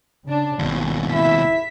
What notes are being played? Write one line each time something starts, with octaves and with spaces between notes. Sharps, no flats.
C#3 D4
G#1 D#2 B2
E4 E5 B6